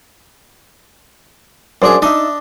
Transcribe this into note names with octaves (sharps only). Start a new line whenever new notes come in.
F#2 D4 G#4 C5 D5
D4 D#4 D#5 E5 A5